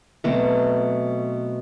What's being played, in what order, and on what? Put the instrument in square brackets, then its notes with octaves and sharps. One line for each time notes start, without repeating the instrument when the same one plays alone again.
[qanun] B2 F#3 A3 C4